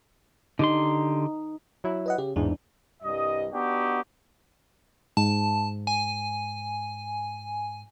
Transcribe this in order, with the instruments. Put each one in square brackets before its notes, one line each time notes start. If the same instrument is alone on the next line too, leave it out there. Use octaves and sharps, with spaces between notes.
[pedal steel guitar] D3 G4 C6 [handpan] D#4
[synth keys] F#3 E4
[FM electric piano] B4 D#5 F#5
[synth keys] C#3 [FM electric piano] G4
[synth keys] A1 E2 G#2 [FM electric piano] D4
[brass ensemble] C2 G2 D#5
B3 D4 D#4 F#4 G4
[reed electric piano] G#2 [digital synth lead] A5
[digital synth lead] G#5